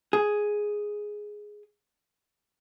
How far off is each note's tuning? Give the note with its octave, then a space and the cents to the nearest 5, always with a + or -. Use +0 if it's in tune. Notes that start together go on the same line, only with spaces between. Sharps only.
G#4 +5